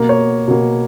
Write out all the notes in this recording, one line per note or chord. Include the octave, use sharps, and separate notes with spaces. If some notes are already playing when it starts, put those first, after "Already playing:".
Already playing: B2 A#3
C#5
B2 A#3